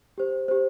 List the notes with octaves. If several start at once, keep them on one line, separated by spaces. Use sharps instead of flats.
G4 C5
G4 C5